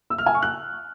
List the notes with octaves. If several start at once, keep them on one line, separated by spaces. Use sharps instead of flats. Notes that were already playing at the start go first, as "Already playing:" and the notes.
E6
F6
G#5
C#6
F#6